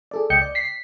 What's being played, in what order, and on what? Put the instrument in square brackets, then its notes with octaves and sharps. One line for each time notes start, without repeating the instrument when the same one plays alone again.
[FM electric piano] G#4 A4 D5
C#2 D#5 G5 G6 C#7
D5
B6 C7